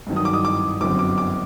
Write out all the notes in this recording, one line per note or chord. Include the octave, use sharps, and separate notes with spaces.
G2 D#3 F#3
D#6
D6
D#6
D6
G1 F#2 D3 F#3 C4 D6
D6
D6